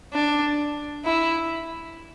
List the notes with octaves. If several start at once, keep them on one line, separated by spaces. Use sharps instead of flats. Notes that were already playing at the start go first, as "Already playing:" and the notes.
D4
E4